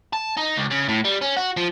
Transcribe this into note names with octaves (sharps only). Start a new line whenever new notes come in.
A5
D#4
C#2
C#3
A2
G3
C#4
F#4
F3